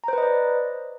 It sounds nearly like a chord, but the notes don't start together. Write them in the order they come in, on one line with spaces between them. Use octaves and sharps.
A#5 C5 B4 D#5 D5